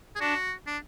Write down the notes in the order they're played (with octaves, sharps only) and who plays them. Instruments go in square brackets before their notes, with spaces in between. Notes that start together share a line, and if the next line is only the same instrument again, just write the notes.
[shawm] G#4
[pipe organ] D4 [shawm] F#4
[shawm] D4